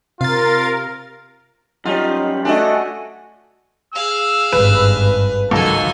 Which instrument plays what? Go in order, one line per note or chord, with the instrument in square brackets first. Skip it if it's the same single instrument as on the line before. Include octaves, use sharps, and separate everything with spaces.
[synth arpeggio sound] C3 [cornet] F4 [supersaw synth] A#4 [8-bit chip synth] F5 A6
[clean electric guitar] F#2 G3 C#4 [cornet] D#4 [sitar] F4
[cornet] A3 [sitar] D4 D#5 [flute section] F#4 G#5
[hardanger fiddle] G#4 F5 [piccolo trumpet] E6
[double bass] G#1 G2 [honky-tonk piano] B4
[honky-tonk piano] C#2 [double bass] D#3 F#3 [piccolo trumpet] A4 [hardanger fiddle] D#5 G#5